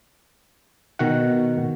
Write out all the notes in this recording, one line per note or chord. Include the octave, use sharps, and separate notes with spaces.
B2 D#3 F#4 F#5